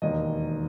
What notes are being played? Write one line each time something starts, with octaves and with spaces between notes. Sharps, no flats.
E1 D#2 D#3 D#5